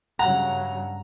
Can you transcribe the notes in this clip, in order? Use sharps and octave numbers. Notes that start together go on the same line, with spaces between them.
G2 C#3 F#3 F#5 A#5